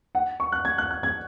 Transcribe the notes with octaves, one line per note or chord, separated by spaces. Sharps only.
F#5
C#6
F#6
G#6
F#6
F#6
G#6